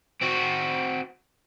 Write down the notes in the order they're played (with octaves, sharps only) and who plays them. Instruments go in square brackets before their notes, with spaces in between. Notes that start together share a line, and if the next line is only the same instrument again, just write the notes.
[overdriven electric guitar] C4 F#4